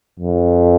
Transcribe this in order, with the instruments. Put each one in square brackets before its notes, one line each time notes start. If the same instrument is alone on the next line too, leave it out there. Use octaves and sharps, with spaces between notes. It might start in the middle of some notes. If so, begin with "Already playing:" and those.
[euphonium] F2